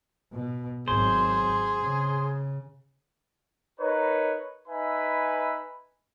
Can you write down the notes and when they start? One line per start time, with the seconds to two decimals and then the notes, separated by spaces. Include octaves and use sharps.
0.33 B2
0.88 G#1 F#3 G#4 C5
1.78 C#3
3.80 D#4 A#4 B4 C#5
4.68 D#4 B4 E5 G#5 B5